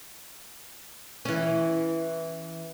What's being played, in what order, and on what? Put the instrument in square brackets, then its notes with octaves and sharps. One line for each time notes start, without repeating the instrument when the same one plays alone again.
[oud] E3 C#4